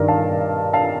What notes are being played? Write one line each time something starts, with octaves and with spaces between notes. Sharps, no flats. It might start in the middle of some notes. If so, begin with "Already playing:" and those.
Already playing: G2 D#3 A#4 D5
F5 A5
F5 A5